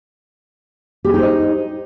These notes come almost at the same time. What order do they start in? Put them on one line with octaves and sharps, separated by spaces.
G4 G#4 D#4 C5 D#5